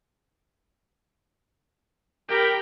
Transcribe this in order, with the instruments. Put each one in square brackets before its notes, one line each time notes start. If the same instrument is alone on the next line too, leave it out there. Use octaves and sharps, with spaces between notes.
[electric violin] G4 B5 [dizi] A#4 [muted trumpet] G5